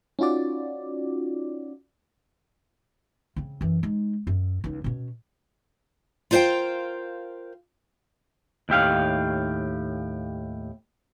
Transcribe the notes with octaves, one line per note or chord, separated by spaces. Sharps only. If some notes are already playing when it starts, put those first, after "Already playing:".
C#4 D#4 F4 F#4 D5
C#3 C4
F#2 E3
G#3 D#4
F#2 C4
C#2 D#4
B2 C#4
F4 A#4 C5 D5 F5 G5
D#2 A2 G4 F5